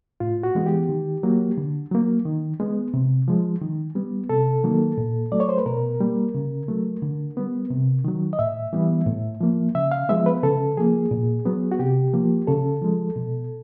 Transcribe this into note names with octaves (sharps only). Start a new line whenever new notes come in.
A2 F4
F#4
E3 G#3 B3
G4
D#3
F#3 A#3
D3
F#3 A#3
D#3
G#3 B3
C3
F3 G#3
D#3
G3 B3
C3 A4
D#3 F#3 A#3
A#2
F#3 A3 D5
C#5
C5
B4
B2 A#4
G3 A#3
C#3
F#3 A3
D3
G3 B3
C3
D#3 F#3
D#5
A2 E5
E3 G3 B3
A2
F3 A#3
C#3 E5
F5
F3 G#3 B3 E5
B4
C#3 A4
F3 A#3 G#4
A#2
F#3 B3
F#4
C3 G4
F3 A#3
C#3 A4
F3 G#3
B2